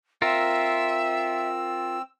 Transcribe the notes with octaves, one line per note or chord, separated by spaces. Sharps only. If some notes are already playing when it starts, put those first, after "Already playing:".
C4 F4 A#4 E5 E6